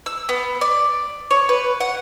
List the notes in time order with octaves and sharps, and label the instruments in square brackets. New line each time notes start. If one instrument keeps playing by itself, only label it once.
[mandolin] E6
B3
D5
C#5
B4
F#5